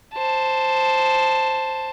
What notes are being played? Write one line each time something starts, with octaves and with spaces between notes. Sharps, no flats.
C5 A5